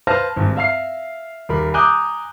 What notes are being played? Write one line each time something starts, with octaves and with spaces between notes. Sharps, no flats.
B4 C5 F5 A5 F6 A#6
G#1 G2
E5 F5 F6 C7
D#1 A#4 B5
G#5 A#5 D6 D#6 F#6 G6